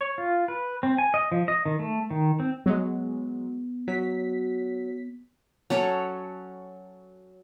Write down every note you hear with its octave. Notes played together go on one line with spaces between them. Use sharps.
C#5
F4
B4
C4
G#5
D#5
F3
D#5
D#3
A3
D#3
C4
F#3 G#3 B3
F#3 B6
F#3 C#4 A4 C#5